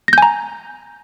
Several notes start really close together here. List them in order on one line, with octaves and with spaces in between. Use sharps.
A#6 G6 G#5 A#5